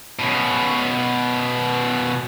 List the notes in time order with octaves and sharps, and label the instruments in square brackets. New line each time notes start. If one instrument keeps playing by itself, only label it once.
[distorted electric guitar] B2 C#4